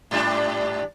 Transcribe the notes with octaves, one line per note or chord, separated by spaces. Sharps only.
G#2 G3 D4